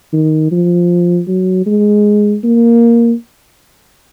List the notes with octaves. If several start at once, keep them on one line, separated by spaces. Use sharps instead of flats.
D#3
F3
F#3
G#3
A#3